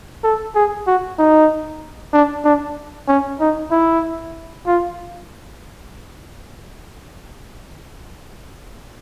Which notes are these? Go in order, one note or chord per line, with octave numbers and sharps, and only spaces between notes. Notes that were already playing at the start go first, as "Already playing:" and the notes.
A4
G#4
F#4
D#4
D4
D4
C#4
D#4
E4
F4